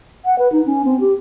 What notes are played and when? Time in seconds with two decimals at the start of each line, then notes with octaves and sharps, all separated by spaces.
0.25 F#5
0.38 B4
0.52 D#4
0.66 C#4
0.85 C4
1.00 G4